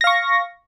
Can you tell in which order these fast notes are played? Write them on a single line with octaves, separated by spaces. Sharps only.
A#6 F5 C#6